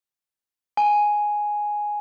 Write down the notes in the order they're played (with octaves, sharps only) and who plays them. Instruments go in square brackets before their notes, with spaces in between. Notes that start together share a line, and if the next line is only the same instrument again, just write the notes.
[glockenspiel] G#5